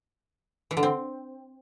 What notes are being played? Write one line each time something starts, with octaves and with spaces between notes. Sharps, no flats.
E3
D3
C4